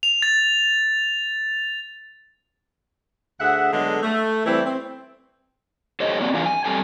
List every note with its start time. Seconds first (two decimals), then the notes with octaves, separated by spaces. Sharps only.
0.03 F7
0.22 A6
3.39 D2 G#4 E5 F#5
3.73 D3 F#3 G#3 B3 A4
4.03 A3
4.45 E3 G3 A3 C4 E4
4.64 C4
6.00 G4 A4 C5 C#5 D#5
6.20 A#3 C4 F#4 D5
6.34 E3 D4 F4 G#4 F5 G#5
6.46 G#5
6.65 F#2 G3 C4 A4 G#5